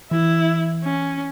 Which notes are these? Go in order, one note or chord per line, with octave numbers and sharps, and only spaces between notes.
E3 E4
C#4